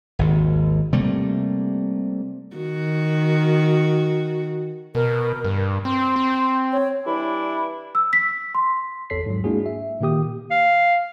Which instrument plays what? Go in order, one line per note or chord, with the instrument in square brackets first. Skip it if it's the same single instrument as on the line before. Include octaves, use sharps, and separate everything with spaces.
[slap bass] G#1 D#2
C3 G3 A3 A#3
[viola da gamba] D#3 F#4
[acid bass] B2 [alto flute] A#4
[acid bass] G2
[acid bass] C4 [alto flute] C6
[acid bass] C4
[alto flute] C#5
[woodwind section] E3 G3 D4 E4
[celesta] E6
B6
C6
[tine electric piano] G#1 E2 A4 C#5 B6 C7
G#2 F#3
G#3 A#3 D4 E4 F#4 G#4
E5
A#2 D#3 A#3 G4 D#6
[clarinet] F5